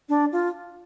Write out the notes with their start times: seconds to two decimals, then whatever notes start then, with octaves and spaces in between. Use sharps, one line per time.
0.09 D4
0.32 F4